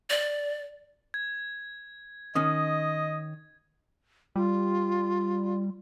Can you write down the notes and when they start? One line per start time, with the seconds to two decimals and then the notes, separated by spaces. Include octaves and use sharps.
0.10 D5
1.14 G#6
2.35 D#3 C#4 D#5 D#6
4.36 G3 F4